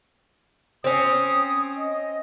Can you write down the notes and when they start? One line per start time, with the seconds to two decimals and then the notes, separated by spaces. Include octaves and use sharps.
0.84 C4 C#4 D#6
1.77 D#5